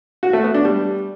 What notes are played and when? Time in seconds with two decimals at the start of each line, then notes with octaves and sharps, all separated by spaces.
0.23 F#4
0.33 A3
0.44 B3
0.54 D4
0.65 G3